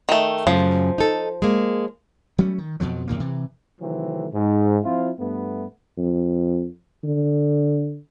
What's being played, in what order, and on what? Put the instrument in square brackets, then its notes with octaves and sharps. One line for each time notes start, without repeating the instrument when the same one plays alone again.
[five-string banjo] D#3 A3
[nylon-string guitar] F#2 C#3 A3 [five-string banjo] F3
[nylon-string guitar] D#4 A4
G#3 A#3
[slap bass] F#3 G3 A3 C#4
D#3
F2 B2 F3 F#3
F#2 A#2 D#3 A#3
C3 E3
[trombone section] C3 D#3 E3 F#3 A3 C4
G#2
F3 C4 E4 F4
G2 A3 B3
[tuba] F2
D3